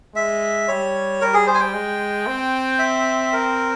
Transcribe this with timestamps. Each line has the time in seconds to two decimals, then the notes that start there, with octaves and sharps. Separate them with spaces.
0.15 G#3 E5
0.68 G3 C#5
1.21 G3 A#4
1.34 G#4
1.47 C5
1.54 G#5
1.60 G5
1.74 G#3
2.27 C4
2.79 E5
3.33 A#4